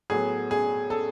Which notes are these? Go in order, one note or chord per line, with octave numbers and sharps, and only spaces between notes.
A2 F#3 B3 G#4
G#4
A4